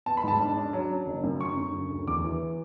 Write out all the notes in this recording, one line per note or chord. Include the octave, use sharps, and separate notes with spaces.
B3 A5
B5
G#2 A5
D4
D4
F#3
C#4
F#1
F#2
D3 C#6
F#2
C#3
D2
E2 D6
E3